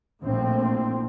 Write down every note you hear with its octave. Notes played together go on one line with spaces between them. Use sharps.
A#1 A2 C4